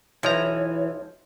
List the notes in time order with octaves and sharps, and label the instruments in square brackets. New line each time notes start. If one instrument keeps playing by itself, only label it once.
[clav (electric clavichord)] B1 F3 A#5 [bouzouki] E3 [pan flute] C#5